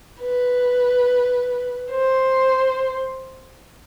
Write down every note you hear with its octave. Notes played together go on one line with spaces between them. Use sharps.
B4
C5